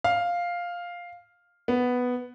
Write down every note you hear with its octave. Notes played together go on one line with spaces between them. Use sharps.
F5
B3